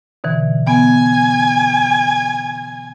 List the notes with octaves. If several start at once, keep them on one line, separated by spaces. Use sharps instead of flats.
B2 D3 E3
B3 G#5